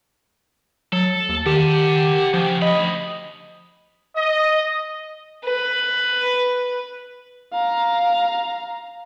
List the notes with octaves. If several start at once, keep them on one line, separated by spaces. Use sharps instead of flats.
F#3 A4
D#2
D#3 G4 F#5 A5
C#3 F3
D2 D#5 B5
D#5
B4
F5 A#5